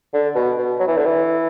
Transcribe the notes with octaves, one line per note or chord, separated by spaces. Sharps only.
D3
B2
B2
F#3
E3
D3
E3